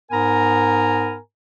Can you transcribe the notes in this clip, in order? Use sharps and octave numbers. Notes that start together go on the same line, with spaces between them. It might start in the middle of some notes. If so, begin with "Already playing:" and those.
G#2 B3 A#4 G#5 A#5